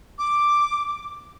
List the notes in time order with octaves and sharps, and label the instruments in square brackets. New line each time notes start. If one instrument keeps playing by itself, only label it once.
[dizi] D6